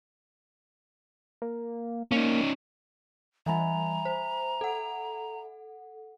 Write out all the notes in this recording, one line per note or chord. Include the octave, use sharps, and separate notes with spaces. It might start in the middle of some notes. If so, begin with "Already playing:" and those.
A#3
A#3 C#4 D#4
E3 G3 E5 G#5 A#5 B5
C5
A4 F#5